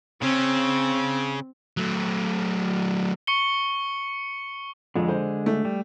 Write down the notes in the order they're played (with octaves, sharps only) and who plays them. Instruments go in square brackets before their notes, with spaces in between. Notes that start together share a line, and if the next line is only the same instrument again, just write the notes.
[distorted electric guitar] C#3 C#4 [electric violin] C4
[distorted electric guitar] F#3 A3
[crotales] C#6 C#7 G7
[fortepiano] F2 [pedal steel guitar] D3 G#3
[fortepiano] C5
A3
[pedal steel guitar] G3